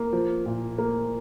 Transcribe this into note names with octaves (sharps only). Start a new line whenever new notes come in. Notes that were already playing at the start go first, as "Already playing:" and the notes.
Already playing: A#3
F3
A#2
A#3